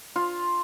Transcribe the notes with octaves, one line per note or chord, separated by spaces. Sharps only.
F4